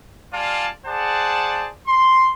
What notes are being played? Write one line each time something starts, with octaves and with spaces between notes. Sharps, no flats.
G3 F4 D5 F5 G#5 A5
G#4 C5 D5 F#5 A5
C6